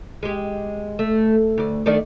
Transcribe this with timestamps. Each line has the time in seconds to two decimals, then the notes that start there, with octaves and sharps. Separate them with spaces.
0.23 G#3 G4
0.99 A3
1.58 D2 D5
1.86 D#3 A3 D4